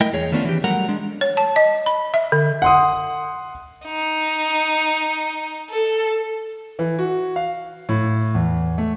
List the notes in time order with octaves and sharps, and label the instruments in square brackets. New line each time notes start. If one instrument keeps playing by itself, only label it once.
[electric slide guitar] A3 E4 A#4 D#5 G5
E2 G#4 C#5
D#3 A3 B3 C#4 D4 F4
E3 G4
F#3 G3 A3 A#4 F#5 A#5
G#3 D4
[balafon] C#5
A5
D#5
B5
E5
D3
[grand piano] F#5 C6 D#6
[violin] D#4
A4
[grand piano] E3
F#4
F5
A2
E2
A3